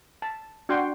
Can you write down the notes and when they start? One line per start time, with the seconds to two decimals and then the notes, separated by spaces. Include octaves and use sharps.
0.22 A5
0.69 D4 F#4 F#5 G5 C6